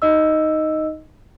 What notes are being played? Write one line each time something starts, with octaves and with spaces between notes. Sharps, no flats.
D#4 D#5 E6